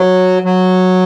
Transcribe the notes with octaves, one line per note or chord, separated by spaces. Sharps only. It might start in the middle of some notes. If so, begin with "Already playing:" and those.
Already playing: F#3
F#3